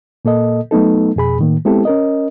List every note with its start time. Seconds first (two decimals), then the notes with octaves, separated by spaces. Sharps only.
0.25 A#2 A#3 A4 D#5
0.71 F#3 A3 B3 D#4 A4
1.16 F2 B2 G#4 B5
1.39 A2 D#3 A#3
1.65 G#3 B3 C4 E4 G4 A4
1.85 C#4 A#4 D#5